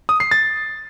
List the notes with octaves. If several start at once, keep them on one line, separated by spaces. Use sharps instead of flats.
D#6
C7
A6